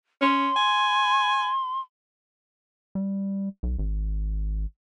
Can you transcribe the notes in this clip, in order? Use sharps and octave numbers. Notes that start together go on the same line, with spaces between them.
C#4 C6
G#5
G3
B1
G#1